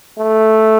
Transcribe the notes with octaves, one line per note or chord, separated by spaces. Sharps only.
A3